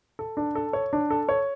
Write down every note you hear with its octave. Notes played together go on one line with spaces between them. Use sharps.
A4
D4
A4
C#5
D4
A4
C#5